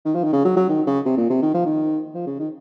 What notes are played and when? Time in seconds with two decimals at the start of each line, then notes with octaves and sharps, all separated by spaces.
0.05 D#3
0.15 F3
0.24 D#3
0.33 C#3
0.45 F#3
0.57 F#3
0.69 D#3
0.87 C#3
1.05 C3
1.17 A#2
1.30 C3
1.42 D#3
1.54 F3
1.66 D#3
2.15 F3
2.27 C#3
2.39 D#3